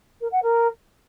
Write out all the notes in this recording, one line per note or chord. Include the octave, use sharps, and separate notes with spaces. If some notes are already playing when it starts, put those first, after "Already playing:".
A#4
F#5
A#4